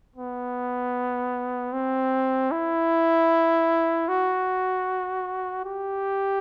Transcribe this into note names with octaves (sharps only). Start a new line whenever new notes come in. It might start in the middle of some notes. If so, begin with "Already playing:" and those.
B3
C4
E4
F#4
G4